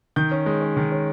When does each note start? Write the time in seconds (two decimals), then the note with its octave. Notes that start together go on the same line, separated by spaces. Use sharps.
0.16 D#3 G6
0.32 C#4
0.46 G#3
0.62 C#4
0.77 D#3
0.92 C#4